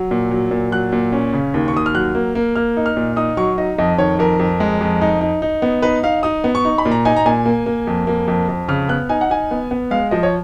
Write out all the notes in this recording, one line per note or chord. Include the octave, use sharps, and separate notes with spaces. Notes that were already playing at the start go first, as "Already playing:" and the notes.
Already playing: F#3
A#2
F#3
A#2
F#3 F#6
A#2
C#4
C#3
D#2
C#6
D#2 D#6
F6
F#3 F#6
A#3
A#3
A#3 F6
D#4
F6
A#2
D#4 D#6
F#3 C#6
D#4 D#5
F2 D#5
D#3 C#5
F2 A#4
F2
G#3
F2
D#4
D#4
D#4
B3
D#4 B4
D#4 F5
D#4 D#6
B3
C#6
D#4
B5
A#2
A#5
D#4 G#5
A#5
A#2 G#5
A#3
A#3
F2
A#3
F2
F2
C#3 F6
B3 F#6
D#4 G#5
F#5
D#4 G#5
B3
B3
G#3 F5
F3 D#5
C#5